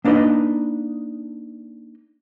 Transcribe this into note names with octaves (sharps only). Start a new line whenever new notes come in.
A#3 D4 D#4 B4 D#5